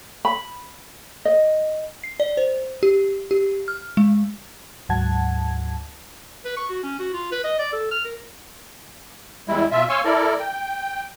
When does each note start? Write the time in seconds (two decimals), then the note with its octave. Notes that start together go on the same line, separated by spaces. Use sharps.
0.25 B5
1.25 D#5
2.04 C7
2.20 D5
2.37 C5
2.83 G4
3.31 G4
3.68 F6
3.97 G#3
4.89 D2 G#2 F#3 F#5 A5 G#6
6.45 B4
6.57 C#6
6.70 F#4
6.83 C#4
6.99 F#4
7.14 F4
7.32 B4
7.44 D#5
7.59 D5
7.73 A4
7.91 F6
8.05 A#4
9.48 E2 G3 G#3 E4
9.72 B2 F4 E5
9.89 C#5 F5 G#5 C6 C#6 E6
10.05 E4 A4 A#4 D5
10.39 G5